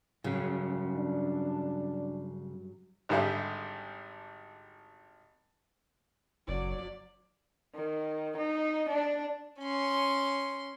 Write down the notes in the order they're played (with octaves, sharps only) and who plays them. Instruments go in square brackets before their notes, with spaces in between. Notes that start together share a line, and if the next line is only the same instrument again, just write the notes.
[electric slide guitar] G2 F#3 [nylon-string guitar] C#3
[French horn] D4
[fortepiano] G#1 D3 G3 G#4 E5
[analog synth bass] F#1 [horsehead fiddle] F#3 D5
[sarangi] D#3
D#4
D4
[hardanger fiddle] C#4 C6